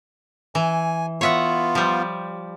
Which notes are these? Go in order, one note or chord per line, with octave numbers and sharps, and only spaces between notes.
E3 G#5
B3 F4 C#5 E5 F#5
F3 G3